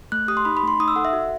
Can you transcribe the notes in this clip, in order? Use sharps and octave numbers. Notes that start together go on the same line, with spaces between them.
A3 F#6
G4 D#6
C6
D#4 B5
B5
A3 C6
D#4 D#6
E6
A4 F#5
E5
F#4